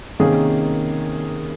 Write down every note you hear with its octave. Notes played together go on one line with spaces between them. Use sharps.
C3 D#3 A#3 C#4 G#4